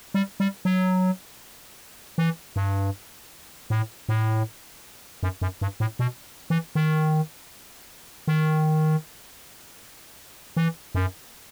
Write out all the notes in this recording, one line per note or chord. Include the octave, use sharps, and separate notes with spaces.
G3
G3
F#3
E3
G2
A2
A2
F#2
F#2
G2
A2
B2
E3
D#3
D#3
E3
F#2